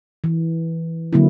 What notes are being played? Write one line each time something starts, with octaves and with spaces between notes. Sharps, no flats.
E3
D3 F#3 A#3 C4 E4